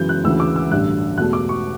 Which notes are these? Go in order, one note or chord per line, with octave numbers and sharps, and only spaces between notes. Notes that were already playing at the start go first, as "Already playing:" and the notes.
Already playing: F#2 C#3 E3 G6
F#6
D2 C#3 E3 E6
D6
E6
A1 G2 D3 F#6
E2 B2 A3 F#6
D6
C#6